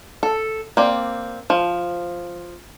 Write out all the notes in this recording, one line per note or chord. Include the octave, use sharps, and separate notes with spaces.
A4
A#3 C4 D5
F3